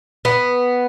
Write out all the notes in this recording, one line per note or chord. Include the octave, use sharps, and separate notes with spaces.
B3